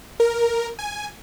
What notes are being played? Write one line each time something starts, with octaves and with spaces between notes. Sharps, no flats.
A#4
G#5